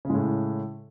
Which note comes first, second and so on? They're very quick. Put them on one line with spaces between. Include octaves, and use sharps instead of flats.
C#3 G#3 A2